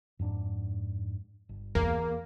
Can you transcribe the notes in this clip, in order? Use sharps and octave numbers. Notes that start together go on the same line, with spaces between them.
F2 G#2 D4
G1
E2 A#3